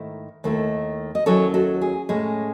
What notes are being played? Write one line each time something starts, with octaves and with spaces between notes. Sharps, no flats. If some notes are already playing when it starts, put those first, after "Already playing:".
Already playing: G#2 D#3 A3 E4
D#2 D#3 A3 E4
D#5
D#2 D#3 F#3 C#4 E4 A4 C#5
F#4 A4
G#4
A2 G#3 C#4 G#4